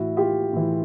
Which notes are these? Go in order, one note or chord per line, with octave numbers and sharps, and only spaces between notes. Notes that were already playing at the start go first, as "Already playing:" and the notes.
Already playing: A2 E3 E4 F#4
F4 G4
A2 E3